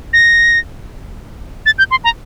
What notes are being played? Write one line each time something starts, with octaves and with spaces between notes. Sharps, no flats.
A#6
A6
G6
C6
A#5